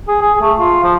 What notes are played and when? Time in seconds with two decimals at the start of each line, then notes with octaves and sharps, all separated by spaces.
0.08 G#4
0.21 G#4
0.41 A3
0.59 F4
0.83 F3